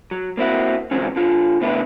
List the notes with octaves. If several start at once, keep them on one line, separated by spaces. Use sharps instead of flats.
F#3
A#3 C4 E4 F#4
C#2 G#2 E3 F#3 C4 C#4
D3 F4
C#3 A3 B3 D4 E4 B4